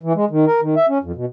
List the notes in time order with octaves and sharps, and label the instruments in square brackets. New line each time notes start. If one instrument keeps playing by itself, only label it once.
[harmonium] E3
G#3
D#3
A#4
D#3
E5
C#4
F2
B2